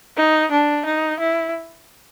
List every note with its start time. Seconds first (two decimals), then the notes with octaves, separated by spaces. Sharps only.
0.17 D#4
0.51 D4
0.85 D#4
1.20 E4